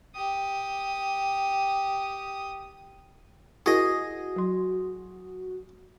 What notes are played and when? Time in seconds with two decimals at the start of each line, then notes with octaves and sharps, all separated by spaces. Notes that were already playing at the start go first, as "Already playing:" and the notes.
0.15 G4 D#6
3.66 E4 F#4 G#4 A#4 D#5
4.36 F#3 C6